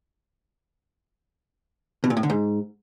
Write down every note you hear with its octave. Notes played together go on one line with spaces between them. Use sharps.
B2
A#2
A2
D3
G#2